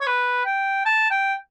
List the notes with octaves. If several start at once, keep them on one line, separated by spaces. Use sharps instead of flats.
C#5
B4
G5
A5
G5